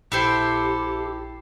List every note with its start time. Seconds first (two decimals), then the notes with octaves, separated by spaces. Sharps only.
0.12 A#1 E4 G4 A4 C5 G5 C7